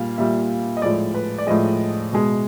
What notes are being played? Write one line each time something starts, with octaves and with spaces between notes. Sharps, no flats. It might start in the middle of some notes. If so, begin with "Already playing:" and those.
Already playing: A#2 G3 F5
A#2 G3 E5
D#5
A2 F3 G#3 D5
B4
D5
A2 F3 G#3 D#5
B2 G#3